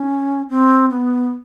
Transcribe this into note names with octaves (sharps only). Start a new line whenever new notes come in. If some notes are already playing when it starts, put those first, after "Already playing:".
Already playing: C#4
C4
B3